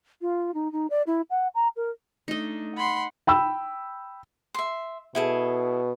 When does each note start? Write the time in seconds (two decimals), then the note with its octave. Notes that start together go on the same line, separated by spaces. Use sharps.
0.22 F4
0.54 D#4
0.72 D#4
0.90 D5
1.07 E4
1.30 F#5
1.55 A#5
1.76 A#4
2.28 A3 D4 D#4 D#5
2.77 F#5 B5 C6
3.27 G5 B5 E6
4.54 E5 C6
5.15 B2 E4 G#4 A4